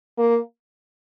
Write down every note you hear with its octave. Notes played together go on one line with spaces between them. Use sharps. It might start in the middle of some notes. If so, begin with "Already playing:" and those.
A#3